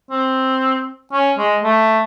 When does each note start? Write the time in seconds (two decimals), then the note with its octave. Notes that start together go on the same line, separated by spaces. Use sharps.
0.10 C4
1.13 C#4
1.38 G#3
1.63 A3